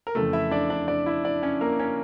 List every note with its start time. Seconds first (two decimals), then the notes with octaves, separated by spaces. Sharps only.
0.07 A#4
0.15 F2 C#3 E3 A3 A4
0.33 E4 E5
0.51 D4 D5
0.70 D4 D5
0.88 D4 D5
1.06 E4 E5
1.24 D4 D5
1.43 C#4 C#5
1.61 A#3 A#4
1.79 C#4 C#5